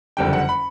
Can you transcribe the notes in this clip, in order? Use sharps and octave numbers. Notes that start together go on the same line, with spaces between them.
F#1 F2 D3 G3 G5
F#5
B5